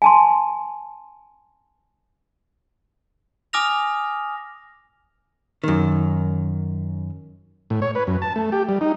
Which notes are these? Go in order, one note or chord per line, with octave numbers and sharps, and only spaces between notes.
G#5 A5 C6
G#5 D6 D#6 F6 A#6 F7
F#2 D#3
A2
C#5
B4
F#2
A5
A3
G4
G3
D#4